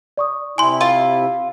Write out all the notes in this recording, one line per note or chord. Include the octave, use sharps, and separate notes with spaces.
D5 C#6 D#6
C3 E4 G#5 C6
F4